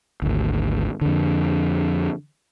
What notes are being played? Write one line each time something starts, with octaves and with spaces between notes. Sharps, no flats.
G#1 D2
F2 D3